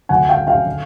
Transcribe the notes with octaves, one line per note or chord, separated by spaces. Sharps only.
D2 D3 F#5 G#5
F5 G5
F5 G5
D3